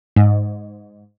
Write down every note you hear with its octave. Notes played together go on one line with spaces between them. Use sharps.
G#2